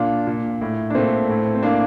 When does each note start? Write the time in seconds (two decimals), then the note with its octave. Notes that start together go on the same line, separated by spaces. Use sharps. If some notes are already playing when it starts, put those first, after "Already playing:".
Already playing: A#2 D4 F4
0.27 A#2
0.61 A2
0.90 D4
0.95 A#2 A3 C4
1.29 A2
1.55 C4
1.63 A2 A#3 D4